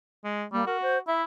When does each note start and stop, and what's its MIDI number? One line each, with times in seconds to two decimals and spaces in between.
0.24 0.45 56
0.53 0.63 55
0.53 0.65 58
0.67 0.99 66
0.67 0.77 70
0.82 0.99 72
1.07 1.24 64
1.07 1.21 76